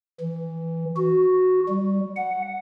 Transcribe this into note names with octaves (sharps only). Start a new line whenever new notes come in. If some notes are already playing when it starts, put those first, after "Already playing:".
E3
F#4
G3
F#5